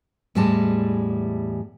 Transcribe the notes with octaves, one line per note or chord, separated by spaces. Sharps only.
E2 A2 E3 G3 G#3 A5